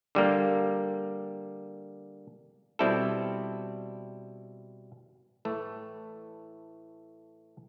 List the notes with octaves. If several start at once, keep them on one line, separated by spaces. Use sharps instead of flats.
D3 G3 A#3
B2 G3 C4 E4 A4
A2 E3 A3